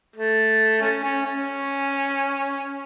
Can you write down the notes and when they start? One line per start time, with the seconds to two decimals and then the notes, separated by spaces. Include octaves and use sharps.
0.16 A3
0.81 A3 C#4
1.04 C#4
1.26 C#4